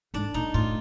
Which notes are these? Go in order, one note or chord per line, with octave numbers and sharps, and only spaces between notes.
G#2 D4
A#2 D#4
A2 F4